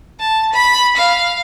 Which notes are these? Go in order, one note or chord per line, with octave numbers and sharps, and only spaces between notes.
A5
B5
F5